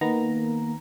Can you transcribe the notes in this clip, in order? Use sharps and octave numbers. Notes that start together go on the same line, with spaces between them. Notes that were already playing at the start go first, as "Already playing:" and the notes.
D#3 A#3 B3 A#5